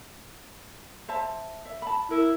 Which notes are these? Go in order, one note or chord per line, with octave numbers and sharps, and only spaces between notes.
C5 E5 A5
E5
A5 B5
E4 A#4